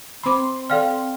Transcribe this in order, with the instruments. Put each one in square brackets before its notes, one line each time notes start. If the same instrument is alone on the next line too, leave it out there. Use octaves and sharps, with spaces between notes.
[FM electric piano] C4 C6 [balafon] B5 D6
[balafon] A4 D5 [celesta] F5 G5 F6